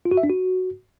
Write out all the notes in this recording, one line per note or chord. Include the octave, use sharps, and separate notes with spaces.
F4
F#4
E5
D4
F#4